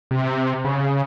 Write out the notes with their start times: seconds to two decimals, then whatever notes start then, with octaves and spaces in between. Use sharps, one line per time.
0.11 C3
0.65 C#3